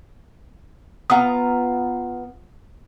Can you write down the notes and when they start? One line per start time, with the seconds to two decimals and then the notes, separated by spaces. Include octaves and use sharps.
1.10 B3 F4 F#5 A#5 D#6